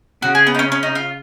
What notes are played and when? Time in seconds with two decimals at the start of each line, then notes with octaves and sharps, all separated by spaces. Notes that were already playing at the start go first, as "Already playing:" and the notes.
0.22 C#3 F#4
0.35 G#4
0.47 B3
0.55 D#4
0.59 C#4
0.72 C#4
0.83 D#4
0.95 F4